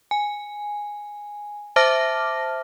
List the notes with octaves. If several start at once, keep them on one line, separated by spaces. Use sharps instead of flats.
G#5
C5 E5 A5 D6 F6 A#6